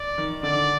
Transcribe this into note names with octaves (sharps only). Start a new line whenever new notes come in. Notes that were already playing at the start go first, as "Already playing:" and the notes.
Already playing: D5
D#3
D3 D5